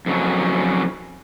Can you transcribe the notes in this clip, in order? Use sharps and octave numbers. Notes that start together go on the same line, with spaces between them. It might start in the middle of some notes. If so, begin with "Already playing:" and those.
F2 C#3 F#3